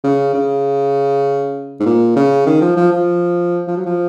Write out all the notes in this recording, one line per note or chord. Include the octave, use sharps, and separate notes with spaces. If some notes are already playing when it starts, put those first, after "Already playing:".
C#3
C#3
G#2
A#2
C#3
D#3
F3
F3
F3
F3
F#3
F3